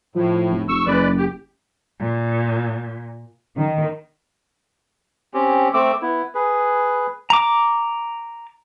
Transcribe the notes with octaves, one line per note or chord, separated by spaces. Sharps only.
A2 F3
F1
F1 C#6 E6
F#1 G#3 B4 D5
G4
A#2
D#3
C4 C#4 G4
A3 C4 D6 E6
B3 E4
G#4 B4
A#5 D6